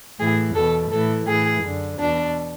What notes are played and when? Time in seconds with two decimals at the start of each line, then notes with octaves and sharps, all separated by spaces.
0.20 A2 E3 G#4
0.56 E2 B2 A4
0.92 A2 E3 A4
1.28 A2 E3 G#4
1.64 F#2 D3
2.00 E2 B2 D4